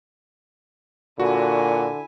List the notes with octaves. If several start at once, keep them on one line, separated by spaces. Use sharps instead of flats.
A#2 D3 E4 F#4 G#5